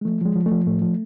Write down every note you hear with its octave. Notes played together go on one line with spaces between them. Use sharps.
G#3
F3 A3
F3 G#3
F3
A3
F3
A2 A3
F3